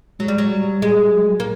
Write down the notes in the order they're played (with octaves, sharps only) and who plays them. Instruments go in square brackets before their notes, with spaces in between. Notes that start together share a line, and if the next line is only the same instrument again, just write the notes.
[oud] F#3 [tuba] G#3
[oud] G3
F#3
[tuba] G3
[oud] G#3
[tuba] F#3
[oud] A#3